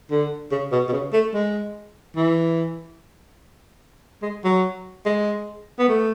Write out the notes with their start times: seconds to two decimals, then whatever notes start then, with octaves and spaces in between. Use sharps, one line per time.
0.11 D3
0.52 C#3
0.72 B2
0.89 B2
0.92 C#3
1.13 A3
1.34 G#3
2.16 E3
4.22 G#3
4.44 F#3
5.05 G#3
5.79 B3
5.88 A3